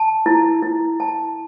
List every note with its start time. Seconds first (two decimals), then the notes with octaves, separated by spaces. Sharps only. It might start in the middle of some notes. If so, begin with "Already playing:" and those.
Already playing: A5
0.26 E4
0.62 E4
1.00 A5